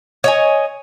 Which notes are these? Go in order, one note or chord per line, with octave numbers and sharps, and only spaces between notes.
C#5 D#5 G#5